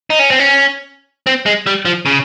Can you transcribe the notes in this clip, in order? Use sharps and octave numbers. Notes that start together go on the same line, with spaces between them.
D#4
C#4
C4
C#4
C4
G#3
G3
F3
C#3